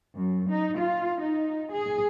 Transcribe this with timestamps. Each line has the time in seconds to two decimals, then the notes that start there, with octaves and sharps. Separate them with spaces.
0.15 F#2
0.50 D#4
0.79 F4
1.22 D#4
1.73 G#4